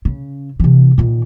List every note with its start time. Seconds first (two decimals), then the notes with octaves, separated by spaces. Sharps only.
0.05 C#3
0.60 C3 E3
0.98 A#2 D#3